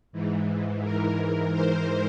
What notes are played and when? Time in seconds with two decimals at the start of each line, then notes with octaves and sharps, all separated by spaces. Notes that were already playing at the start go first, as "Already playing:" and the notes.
0.12 G#2 E3
0.82 A#4
1.52 C5